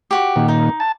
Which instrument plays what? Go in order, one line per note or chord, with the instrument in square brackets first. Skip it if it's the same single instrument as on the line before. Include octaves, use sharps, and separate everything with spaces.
[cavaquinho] F#4 G4
[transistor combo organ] A#2 D#3
[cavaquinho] D#4
[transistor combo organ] A5